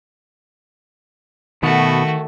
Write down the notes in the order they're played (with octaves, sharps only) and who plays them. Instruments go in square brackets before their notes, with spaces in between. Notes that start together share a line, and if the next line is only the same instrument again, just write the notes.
[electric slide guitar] B2 B3 [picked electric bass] D#3 [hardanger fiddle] A3 [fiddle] F#4